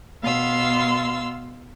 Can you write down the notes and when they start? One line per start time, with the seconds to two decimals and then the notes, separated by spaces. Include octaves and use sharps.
0.22 B2 B3 F5 C6 E6